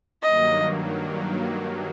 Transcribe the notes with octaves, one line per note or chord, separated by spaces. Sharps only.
G2 D#3 F#3 A#3 D#5